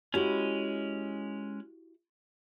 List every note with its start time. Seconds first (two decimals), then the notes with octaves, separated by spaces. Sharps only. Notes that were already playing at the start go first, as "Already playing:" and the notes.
0.14 G#3 C#4 E4 F#4 G4